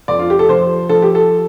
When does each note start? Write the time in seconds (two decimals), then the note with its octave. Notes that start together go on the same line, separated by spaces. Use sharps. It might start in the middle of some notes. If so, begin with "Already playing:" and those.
0.08 F2 D5
0.19 F4
0.30 G4
0.39 A4
0.49 F3 C5
0.89 F3 A4
1.02 G4
1.15 A4